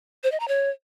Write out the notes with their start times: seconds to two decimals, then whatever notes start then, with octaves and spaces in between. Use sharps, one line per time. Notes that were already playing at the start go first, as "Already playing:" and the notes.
0.24 C5
0.32 D#5
0.40 A#5
0.48 C#5